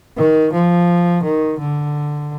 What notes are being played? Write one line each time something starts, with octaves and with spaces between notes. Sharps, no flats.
D#3
F3
D#3
D3